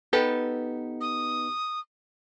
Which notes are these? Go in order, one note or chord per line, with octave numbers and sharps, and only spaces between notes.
B3 D#4 G4 A4 B4
D#6